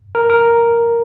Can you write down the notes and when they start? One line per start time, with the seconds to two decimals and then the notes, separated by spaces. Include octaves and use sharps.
0.15 A#4
0.30 A#4